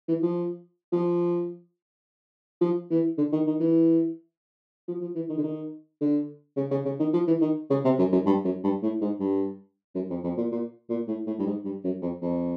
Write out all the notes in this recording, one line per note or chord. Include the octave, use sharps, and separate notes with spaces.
E3
F3
F3
F3
E3
D3
D#3
D#3
E3
F3
F3
E3
D#3
D3
D#3
D3
C#3
C#3
C#3
D#3
F3
E3
D#3
C#3
C3
F#2
F#2
G2
F#2
G2
A2
G#2
G2
F#2
F2
F2
A#2
A#2
A#2
A2
A2
G2
G#2
G2
F#2
F2
F2